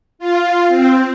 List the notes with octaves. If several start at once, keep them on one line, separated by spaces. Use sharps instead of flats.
F4
C4